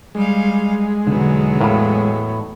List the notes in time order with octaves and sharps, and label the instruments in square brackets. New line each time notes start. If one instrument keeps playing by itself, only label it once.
[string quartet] G3 F5 [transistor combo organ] G#3
[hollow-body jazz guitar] B1 D3 [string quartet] E2 F#3 B3
[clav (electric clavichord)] A2 [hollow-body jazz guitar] A#4 F5 B5